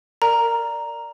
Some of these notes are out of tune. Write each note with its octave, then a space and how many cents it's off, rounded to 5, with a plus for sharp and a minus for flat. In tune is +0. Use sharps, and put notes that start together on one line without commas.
A#4 -20 D5 +0 A#5 +0